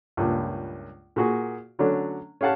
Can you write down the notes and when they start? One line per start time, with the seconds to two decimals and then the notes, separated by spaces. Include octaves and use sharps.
0.17 C#2 G2 A#2
1.16 A#2 F#4 G#4
1.79 D3 F#3 A3 C#4 D4
2.41 C#4 G4 F5 F#5 A5